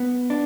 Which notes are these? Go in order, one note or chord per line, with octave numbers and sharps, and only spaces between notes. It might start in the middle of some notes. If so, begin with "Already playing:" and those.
Already playing: B3
D4